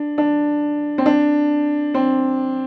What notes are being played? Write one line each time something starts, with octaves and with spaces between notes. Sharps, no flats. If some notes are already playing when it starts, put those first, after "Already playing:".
Already playing: D4
D4
C4
D4
C4